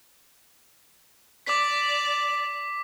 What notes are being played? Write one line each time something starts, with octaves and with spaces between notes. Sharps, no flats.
D5 D6 B6